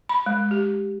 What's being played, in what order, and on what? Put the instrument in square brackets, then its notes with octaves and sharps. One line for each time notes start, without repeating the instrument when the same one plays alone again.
[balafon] B5
G#3
G4